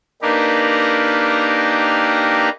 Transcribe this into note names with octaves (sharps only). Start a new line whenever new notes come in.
A#3 D4 D#4 G4 A#4 B4